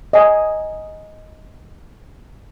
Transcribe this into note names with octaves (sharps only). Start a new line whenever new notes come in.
D#5 G#5